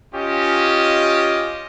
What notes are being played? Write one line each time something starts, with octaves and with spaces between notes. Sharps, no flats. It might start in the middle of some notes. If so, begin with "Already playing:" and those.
C#4 F4 G4 D#5